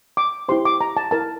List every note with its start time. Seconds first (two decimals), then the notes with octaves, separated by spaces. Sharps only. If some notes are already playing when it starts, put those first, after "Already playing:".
0.17 D6
0.49 E4 G4 C5 C6
0.65 D6
0.81 A#5
0.97 A5
1.11 E4 A#4 A5